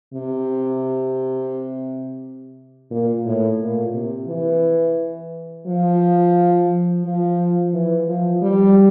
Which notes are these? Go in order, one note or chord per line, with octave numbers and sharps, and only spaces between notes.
C3
A#2
A2
A#2
C3
E3
F3
F3
E3
F3
G3